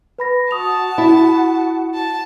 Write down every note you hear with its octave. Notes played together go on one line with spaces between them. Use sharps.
B4 B5 A#6
F#4 F#5 A5 C#6 D#6 F7
E4
A5